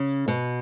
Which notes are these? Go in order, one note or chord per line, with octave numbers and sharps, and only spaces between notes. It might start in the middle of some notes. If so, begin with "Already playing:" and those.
Already playing: C#3
B2